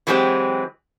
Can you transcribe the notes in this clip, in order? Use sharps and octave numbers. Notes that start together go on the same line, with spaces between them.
E3 F#3 G#3 C4 G4